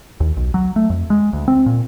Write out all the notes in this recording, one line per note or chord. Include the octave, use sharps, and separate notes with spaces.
D#2
B1
F#3
A3
F2
G#3
D2
C4
A#2